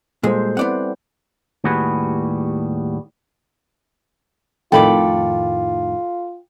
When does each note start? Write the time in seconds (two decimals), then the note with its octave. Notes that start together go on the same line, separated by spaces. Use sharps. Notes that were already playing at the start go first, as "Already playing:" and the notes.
0.23 A#2 G3 G#3 A4 C5
0.57 B3 C4 E4 D5 F#5
1.64 D#2 A2 G3 F#4 G#4 B4
4.72 F2 A2 D#3 F4 A4 G5 B5 D6